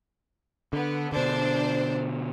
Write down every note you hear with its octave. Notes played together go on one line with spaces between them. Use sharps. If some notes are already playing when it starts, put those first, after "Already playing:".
D3 B3
B2 D3 D4 C5